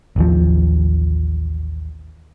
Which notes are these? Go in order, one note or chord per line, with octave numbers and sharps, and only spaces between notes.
A1 D#2 F3